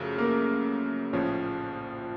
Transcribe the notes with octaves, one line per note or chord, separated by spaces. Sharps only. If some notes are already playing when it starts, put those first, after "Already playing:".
Already playing: F#2 C#3 F3 A3
A#3 A#4
A#1 A2 F3 C#4 C#5